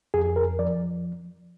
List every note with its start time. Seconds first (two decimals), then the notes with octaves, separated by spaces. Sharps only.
0.14 F2 G#4
0.36 A#4
0.59 F3 D5